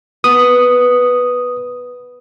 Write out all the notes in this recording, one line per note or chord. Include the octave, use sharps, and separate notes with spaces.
B3 D#6